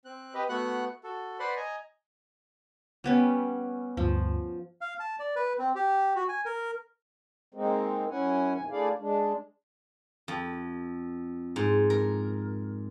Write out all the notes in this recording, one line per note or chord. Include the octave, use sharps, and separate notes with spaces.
C4 F#6
G4 B4 D#5
A3 B3 F#4 F#5 F#6
F#4 A4
B4 C5 D5 F#5 B5 C6
D#5 G#5 A#5
G3 B3 C#4
D2 G2 F3
F5
A5
D5
B4
C4
G4
F#4
G#5
A#4
G#3 A#3 C4 D#4
F#2 C#4 E4 F#5 G#5
F#2 C3 D#3 G#5
A3 D4 E4 G#4 D5 F5
G#3 D4
F2
G#2
A#4